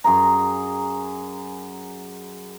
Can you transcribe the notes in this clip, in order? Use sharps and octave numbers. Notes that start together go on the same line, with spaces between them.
F#2 G#4 A#5